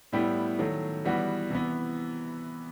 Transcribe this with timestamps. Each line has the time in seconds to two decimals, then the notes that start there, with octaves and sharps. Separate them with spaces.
0.13 A2 G3 B3 E4 G4
0.59 D#3 F#3 A3
1.05 E3 G3 B3 F#4
1.50 C3 E3 B3